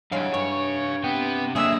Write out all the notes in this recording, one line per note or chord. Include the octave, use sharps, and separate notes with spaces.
G2 F#3 G#3 E4 F5 G#5
G2 C#5
C3 B3 G5
D3 F#3 G#3 A#3 D4 G#4 E5